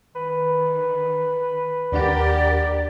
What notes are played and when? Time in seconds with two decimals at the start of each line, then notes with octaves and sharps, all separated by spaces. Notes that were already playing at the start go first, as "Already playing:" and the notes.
0.16 D#3 B4
1.92 D#2 D4 G4 A#4 D5 F#5